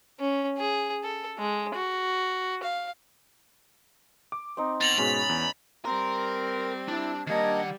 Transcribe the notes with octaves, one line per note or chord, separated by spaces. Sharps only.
C#4
G#4
A4
G#3
F#4
F5
D6
C4 D#4
B2 A6 F7 F#7
G#2 B2 G#3 C#4 B5
E2
G3 C4 A#4 C6
D4 E4
D#3 G3 A#3 D4 D#5 F#5 G#6